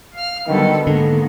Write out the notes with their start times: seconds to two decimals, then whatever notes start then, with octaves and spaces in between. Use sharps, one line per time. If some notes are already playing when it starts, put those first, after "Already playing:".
0.13 F5 F6
0.48 B2 D3 D#3 F#3 G3 B3 A4
0.87 G#2 D3 D#3 A#3 B3 A4